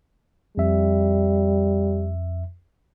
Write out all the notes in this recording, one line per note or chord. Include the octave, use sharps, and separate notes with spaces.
F2 G3 E5